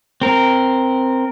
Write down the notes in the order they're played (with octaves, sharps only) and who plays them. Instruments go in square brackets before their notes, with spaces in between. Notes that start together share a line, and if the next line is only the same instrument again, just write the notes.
[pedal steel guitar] C4 A#4